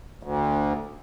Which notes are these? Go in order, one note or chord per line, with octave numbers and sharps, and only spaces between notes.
D2